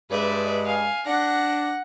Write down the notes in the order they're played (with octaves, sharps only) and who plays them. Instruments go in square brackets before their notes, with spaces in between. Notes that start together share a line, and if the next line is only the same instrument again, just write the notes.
[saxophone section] G2 G#3 [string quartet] B4 D5 E5
[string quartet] F5 G#5
[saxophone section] D4 [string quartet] F#5 A#6